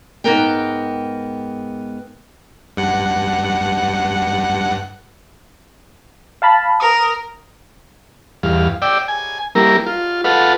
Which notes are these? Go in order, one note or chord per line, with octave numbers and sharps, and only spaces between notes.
G#2 E3 B3 A#4 G5
G2 F#5
F5 A5 B5
A#4 D#6
E2 G2 F5
D5 G5 E6
G#5
G3 A#3 E4 A#4
F4
F4 A4 B4 F5 F#5